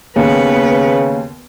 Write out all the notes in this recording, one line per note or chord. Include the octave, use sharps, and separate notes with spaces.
D#2 C#3 B3 B4